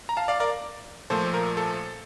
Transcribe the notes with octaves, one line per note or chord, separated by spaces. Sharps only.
A#5
F5 A5
D5 F5
A#4 D5
A#2 F3 A3 A4 C5
A#4
A4